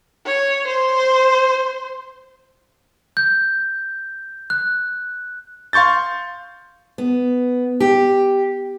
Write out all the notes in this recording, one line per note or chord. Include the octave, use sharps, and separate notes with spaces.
C#5
C5
G6
F#6
F5 C6 C#6 G6 A6
B3
G4